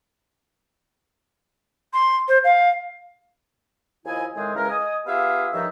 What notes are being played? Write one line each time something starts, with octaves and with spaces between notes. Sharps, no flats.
C6
C5
F5
D#2 F3 E4 D#5 G#5
A2 D#3 G#3 C4 G#4 G#5
C#3 E3 G#3 A#4
D#5 G#5 D#6
B3 F4 G4 G#4 E5 F5
G2 D#3 F3 D#4 C#5 E5